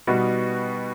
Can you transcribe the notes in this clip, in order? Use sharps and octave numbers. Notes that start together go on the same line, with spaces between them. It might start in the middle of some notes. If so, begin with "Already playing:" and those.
B2 G3 B3 D#4 F#4